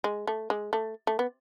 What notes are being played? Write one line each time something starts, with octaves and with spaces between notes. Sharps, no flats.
G#3
A3
G#3
A3
A3
B3